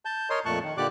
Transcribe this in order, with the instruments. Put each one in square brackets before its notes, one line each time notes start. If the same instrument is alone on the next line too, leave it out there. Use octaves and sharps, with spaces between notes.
[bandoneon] A5 G6
A#4 C#5 D#5 C6
F2 A#2 A3 A5 C#6 F#6
D#3
A#2 D3 G4 D5 D6 F#6